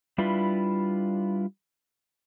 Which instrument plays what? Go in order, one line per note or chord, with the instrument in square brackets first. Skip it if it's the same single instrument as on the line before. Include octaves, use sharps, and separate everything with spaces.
[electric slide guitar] G3 D4 E4 F4 B4